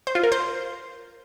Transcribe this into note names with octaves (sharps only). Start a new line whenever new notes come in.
C5
F4
A#4
C5